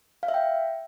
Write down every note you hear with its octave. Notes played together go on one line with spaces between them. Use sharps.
F5
E5
G5